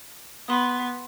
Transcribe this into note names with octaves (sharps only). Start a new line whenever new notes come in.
B3 B5 C6 D#6